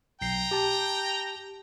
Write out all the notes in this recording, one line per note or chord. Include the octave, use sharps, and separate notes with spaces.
B1 G5 A#5 C7
G4 A5